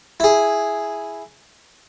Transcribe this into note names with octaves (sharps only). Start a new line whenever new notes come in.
E4 G#4